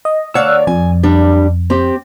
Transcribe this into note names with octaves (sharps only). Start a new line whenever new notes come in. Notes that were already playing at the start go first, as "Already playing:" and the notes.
D#5
D2 C#5 D5 F5 F#5 E6
F2 G#5
G3 D4
C4 G4